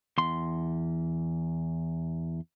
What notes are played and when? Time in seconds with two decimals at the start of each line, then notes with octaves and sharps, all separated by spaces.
0.18 E2 C6